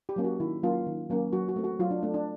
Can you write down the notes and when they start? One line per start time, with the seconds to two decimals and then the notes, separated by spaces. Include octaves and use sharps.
0.09 G4
0.16 F#3 A#3 C#4
0.24 F#4
0.40 D#3 E4
0.63 F#3 A#3 C#4 F4
0.87 D#3
1.10 F#3 A#3 C#4
1.33 F#3 F#4
1.49 F#4
1.56 A3 C4
1.64 F#4
1.80 F#3 F4
1.91 D4
2.03 A3 C4 D4
2.14 D4